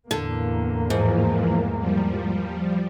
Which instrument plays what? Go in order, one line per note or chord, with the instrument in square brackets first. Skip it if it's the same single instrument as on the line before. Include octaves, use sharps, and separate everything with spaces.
[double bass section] E2 A2 A#3 [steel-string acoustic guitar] D3
[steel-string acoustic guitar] G#2 [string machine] E3 F3
[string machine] F3 G3